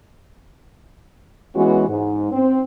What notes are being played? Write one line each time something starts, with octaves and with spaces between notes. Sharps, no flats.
E3 G#3 B3 C#4 F#4
G#2
C4